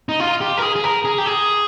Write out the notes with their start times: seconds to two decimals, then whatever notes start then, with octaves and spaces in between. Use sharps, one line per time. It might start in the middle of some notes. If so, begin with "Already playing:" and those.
0.09 D#4
0.20 F4
0.41 G4
0.57 A#4
0.62 G#4
0.76 G#4
0.84 A#4
1.05 G#4
1.18 G4
1.26 G#4